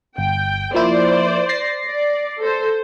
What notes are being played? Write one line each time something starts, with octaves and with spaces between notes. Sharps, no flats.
G1 G5
F3 A#3 E4 C5 D5
A6 A#6 C7
D5
A4 C5